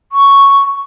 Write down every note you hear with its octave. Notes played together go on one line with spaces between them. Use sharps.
C#6